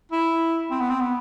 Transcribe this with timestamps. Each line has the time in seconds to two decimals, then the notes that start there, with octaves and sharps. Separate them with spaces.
0.12 E4
0.71 C4
0.80 B3
0.90 C4
1.01 B3